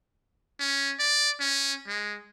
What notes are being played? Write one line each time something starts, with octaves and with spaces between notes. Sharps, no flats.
C#4
D5
C#4
G#3